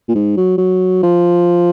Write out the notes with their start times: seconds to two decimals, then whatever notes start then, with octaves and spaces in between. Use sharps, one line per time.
0.08 A#2
0.15 G#2
0.37 F#3
0.58 F#3
1.03 F3